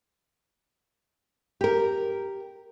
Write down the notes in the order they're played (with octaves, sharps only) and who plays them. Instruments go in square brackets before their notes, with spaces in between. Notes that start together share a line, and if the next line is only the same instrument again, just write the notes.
[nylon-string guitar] G4 A#4